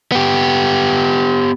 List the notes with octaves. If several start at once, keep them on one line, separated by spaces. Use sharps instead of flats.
B3 G4